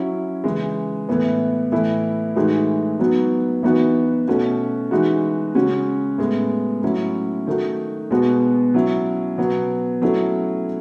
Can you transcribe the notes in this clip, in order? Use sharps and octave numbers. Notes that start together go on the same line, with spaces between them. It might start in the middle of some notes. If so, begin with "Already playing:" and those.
Already playing: F#3 C#4 E4
C#3 E3 G#3
A2 E3 B3
A2 E3 A3 E4
A2 E3 G#3 D#4 F#4
F#3 B3 D#4 F#4
E3 B3 D#4 F#4
B2 A3 C#4 F#4
E3 G#3 D#4 F#4
C#3 G#3 C#4 F#4
A2 G#3 B3
A2 F#3 C#4 E4
D#3 A3 D#4 F#4
B2 G#3 B3 F#4
F#3 C#4 E4
B2 F#3 B3
F#3 A3 C#4 E4